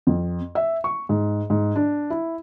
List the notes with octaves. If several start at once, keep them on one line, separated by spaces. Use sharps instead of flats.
F2
E5
C#6
G#2
G#2
D4
E4